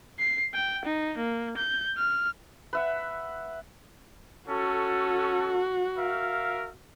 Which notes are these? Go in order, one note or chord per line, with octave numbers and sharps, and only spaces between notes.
C7
G5
D#4
A#3
G6
F6
B4 E5 F#5
C#4 F#4 A4
A#4 E5 F5